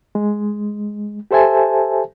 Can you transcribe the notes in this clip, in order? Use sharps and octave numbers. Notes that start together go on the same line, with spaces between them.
G#3
G4 A4 C5 E5 G#5 A5